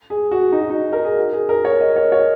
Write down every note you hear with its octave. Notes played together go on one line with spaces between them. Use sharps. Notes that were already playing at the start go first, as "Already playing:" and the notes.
G#4
F#4
D#4
F#4
D#4
A#4
G#4
F#4
G#4
A#4
C#5
D#5
C#5
C#5